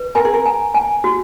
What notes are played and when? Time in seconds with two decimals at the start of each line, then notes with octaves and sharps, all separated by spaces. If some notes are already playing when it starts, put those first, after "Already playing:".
Already playing: B4
0.15 A#4 G#5
0.25 G#4
0.34 A#4
0.46 G#5
0.74 G#5
1.04 F#4